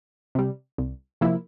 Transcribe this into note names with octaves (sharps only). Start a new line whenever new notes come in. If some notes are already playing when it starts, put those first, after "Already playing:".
C3 G3
C2
C3 F3 A#3 E4